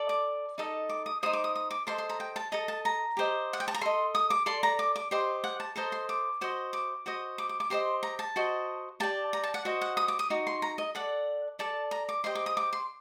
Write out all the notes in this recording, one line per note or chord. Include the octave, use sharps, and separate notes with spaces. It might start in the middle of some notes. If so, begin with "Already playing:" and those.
Already playing: A4 D5
D6
D#4 A4 D#5
D6
D#6
D#4 F#4 C5 D#6
D6
D#6
D#6
D6
A4 C5 D#5 C6
C6
A#5
G5
A5
A4 D#5 A#5
A5
A#5
G4 C5 D#5
F#5
G5
A5
A#5
A4 D#5 C6
D#6
D6
A4 D5 C6
A#5
D6
D6
G4 C5 D#5 C6
F#5
A5
A4 C5 D#5 A#5
C6
D6
F#4 C5 D#5
D6
F#4 C5 D#5
D6
D6
D6
G4 C5 D#5 C6
A#5
A5
F#4 C5 D#5
G4 D5 A5
A#5
A5
F#5
F#4 C5 D#5
F#5
D#6
D6
D#6
D#4 F#4
C6
A#5
D#5
A4 D5 F#5
A4 D5 A5
A#5
D6
G4 C5 D#5 C6
D6
D#6
D6
C6